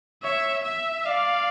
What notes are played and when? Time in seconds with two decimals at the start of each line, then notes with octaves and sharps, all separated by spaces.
0.23 C#5 E5
0.65 E5
1.06 D5 F5